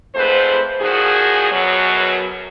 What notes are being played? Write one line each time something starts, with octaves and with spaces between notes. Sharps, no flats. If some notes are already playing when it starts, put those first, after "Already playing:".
F2 G#2 A3 B4 C5
A#2 D#3 F3 F#4 G#4
F#2 B2 F#3